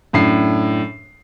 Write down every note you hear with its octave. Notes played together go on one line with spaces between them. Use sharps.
F#2 A2 D4 C7